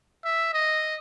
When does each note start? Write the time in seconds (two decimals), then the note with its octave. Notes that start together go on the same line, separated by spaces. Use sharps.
0.25 E5
0.54 D#5